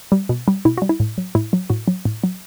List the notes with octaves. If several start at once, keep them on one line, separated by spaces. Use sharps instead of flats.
G3
B2
G3
B2 E4
G3 F#4
E4
A2
F#3
A2 E4
F#3
A2 F#4
F#3
A2
F#3